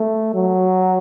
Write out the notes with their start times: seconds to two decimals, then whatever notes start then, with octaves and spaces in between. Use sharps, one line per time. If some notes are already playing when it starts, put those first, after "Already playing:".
Already playing: A3
0.34 F#3